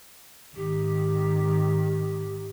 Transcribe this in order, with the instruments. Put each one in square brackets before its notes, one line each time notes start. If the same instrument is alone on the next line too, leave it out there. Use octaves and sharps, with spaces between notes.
[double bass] G#1 D#3 [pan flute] G4